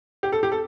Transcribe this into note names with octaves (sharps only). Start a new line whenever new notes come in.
G4
A4
G4
A4